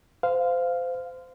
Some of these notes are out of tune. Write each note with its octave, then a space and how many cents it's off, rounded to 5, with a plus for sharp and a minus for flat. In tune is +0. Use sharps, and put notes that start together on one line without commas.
C5 -25 F5 +0